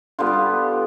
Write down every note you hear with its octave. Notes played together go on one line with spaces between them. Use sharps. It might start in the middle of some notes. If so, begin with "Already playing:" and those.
D3 G3 B3 F4
G4